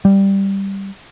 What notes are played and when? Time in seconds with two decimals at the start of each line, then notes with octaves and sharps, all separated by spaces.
0.05 G3